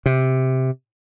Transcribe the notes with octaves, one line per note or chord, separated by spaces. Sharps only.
C3